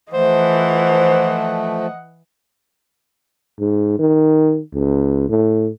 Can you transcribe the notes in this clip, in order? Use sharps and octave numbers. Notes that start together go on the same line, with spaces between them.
E3 F3 A3 C5 D#5 F#5
G#2
D#3
C#2
A2